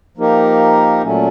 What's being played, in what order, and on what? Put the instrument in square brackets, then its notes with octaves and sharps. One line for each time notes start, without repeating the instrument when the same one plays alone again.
[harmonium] F3 A#3 D#4 G4 A#4
A#2 F#3 A3 C#4